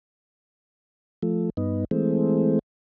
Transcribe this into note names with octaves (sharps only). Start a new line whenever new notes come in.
F3 A3
G2 B3 D#4
E3 G#3 A3 C4